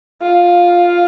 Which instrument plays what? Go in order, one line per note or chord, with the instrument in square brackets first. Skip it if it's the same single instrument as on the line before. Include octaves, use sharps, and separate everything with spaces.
[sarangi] F4